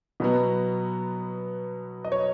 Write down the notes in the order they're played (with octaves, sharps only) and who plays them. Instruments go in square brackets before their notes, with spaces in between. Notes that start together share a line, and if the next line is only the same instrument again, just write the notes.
[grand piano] B2 F#3 B3
D#5
C#5